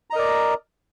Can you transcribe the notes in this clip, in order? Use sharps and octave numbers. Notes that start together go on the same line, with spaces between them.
A#4 D5 D#5 A#5